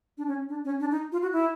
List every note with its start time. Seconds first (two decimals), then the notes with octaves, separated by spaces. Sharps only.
0.18 D4
0.28 C#4
0.49 D4
0.65 C#4
0.80 D4
0.91 D#4
1.12 F4
1.22 F#4
1.33 E4